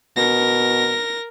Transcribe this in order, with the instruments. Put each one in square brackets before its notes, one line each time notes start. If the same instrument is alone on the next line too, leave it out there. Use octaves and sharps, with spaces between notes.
[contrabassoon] B2 [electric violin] A#4 A#6